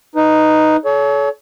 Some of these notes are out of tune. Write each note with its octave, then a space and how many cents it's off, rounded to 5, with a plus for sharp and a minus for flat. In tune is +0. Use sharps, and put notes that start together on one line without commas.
D#4 +0 B4 +0
A4 -40 C#5 +30